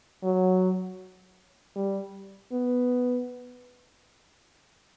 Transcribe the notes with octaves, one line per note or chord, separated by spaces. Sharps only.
F#3
G3
B3